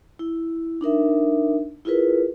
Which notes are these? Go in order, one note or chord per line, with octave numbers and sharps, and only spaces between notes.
E4
D4 D#4 A#4 E5
E4 F4 G#4 A#4 B4